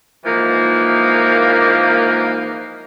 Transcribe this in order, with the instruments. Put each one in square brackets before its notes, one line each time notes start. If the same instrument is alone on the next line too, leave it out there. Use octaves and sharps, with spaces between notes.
[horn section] G#2 E3 F3 A#3